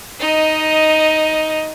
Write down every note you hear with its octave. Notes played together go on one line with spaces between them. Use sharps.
D#4 D#5